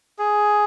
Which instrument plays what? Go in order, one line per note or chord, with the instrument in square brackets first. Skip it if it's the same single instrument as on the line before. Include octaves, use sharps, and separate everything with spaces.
[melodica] G#4